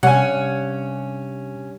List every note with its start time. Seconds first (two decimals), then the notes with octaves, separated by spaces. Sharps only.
0.03 G2 C3 G3 C#4 F#5 G#5